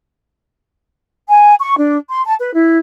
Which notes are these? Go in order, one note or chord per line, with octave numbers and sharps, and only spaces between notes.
G#5
C#6
D4
C6
A5
B4
E4